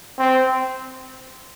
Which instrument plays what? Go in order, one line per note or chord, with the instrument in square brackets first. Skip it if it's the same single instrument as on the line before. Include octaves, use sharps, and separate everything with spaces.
[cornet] C4